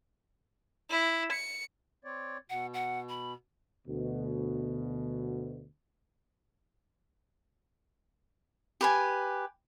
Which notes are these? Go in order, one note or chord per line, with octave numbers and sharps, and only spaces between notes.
E4
C#7
C4 C#5 D5
B2 F#5
F#5
B5
D2 B2
G4 B4 G#5